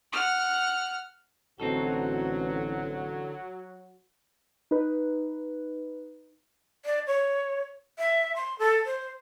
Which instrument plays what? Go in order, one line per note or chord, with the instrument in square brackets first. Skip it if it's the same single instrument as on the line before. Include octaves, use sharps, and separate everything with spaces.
[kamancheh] F#5 F6
[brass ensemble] A1 [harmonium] D3 [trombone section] F#3 F#4 [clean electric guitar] C4 D#4 A4
[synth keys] D#4 B4
[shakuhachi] D5
C#5
E5
C6
A4
C5